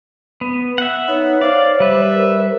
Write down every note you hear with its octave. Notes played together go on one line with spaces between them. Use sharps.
B3
E5 F#5
B3 D#4 C#5
C5 D5 F5
G3 B4 E5
A#4